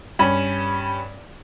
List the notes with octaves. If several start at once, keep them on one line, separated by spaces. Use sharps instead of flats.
G2 C#4 B5